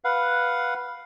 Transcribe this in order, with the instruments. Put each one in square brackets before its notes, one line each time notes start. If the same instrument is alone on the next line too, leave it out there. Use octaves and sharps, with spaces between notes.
[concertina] B4 F5 F#5